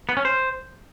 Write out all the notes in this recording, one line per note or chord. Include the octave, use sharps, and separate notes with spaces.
B3
C#4
C5